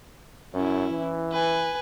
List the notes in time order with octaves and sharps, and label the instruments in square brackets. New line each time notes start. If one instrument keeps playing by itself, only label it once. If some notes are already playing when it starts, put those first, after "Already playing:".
[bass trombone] F#2 [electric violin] C#4 E4
[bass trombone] E3
[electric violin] B4 G#5